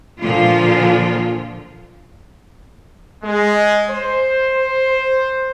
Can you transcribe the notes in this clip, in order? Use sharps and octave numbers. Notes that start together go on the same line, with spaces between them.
A#2 D3 F3 F4
G#3
C5